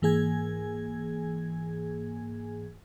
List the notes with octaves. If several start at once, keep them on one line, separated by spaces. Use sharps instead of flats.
G#2 E3 A#3 G#4 G#5 G#6